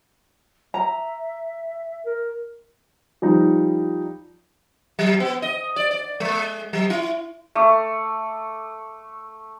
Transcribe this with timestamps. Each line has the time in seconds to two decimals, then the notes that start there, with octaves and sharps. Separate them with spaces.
0.74 E5 A#5
2.06 A#4
3.22 F3 G3 D#4
4.99 F#3
5.20 B3
5.42 D#5
5.76 D5
5.91 D5
6.20 G#3
6.73 F#3
6.90 E4
7.55 A3 D6